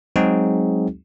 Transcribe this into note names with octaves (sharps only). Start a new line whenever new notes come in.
F#3 G#3 C4 D#4 F#4 G#4